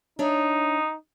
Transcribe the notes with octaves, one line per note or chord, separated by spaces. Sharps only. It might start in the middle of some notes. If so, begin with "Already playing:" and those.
D4 D#4 C#5 E5